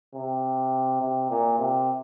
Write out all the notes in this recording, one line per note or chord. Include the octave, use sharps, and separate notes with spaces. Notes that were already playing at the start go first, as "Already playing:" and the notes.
C3
C3
A#2
C3